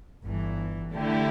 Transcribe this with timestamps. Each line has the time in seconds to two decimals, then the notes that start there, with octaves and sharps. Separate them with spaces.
0.24 G1 G2 E3
0.94 D3 A3 E4 G4